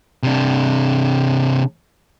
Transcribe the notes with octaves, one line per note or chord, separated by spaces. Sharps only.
C3 D4